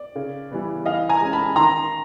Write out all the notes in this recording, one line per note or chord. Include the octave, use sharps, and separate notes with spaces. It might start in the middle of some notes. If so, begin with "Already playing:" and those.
Already playing: D5
C#3
E3 G3 B3
E3 D#5 F5
G#5 A#5
G#3 C#4
A5 B5
D#3 A#5 C6